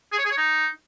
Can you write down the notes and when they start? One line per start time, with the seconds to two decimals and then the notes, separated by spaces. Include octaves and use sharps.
0.12 G#4
0.18 C#5
0.25 G#4
0.31 C#5
0.37 D#4